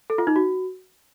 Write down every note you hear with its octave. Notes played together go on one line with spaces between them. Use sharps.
A4
F4
D#4
F#4